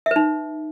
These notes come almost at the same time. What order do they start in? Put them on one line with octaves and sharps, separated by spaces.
E5 B4 D#4